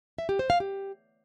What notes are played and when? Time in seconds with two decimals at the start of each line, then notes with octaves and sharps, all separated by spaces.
0.18 E5
0.29 G4
0.39 C5
0.50 F5
0.60 G4